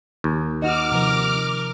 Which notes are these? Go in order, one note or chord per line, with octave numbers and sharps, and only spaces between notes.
D#2
D#4 F#4 D#5 D6 F6
C3 F3 A#4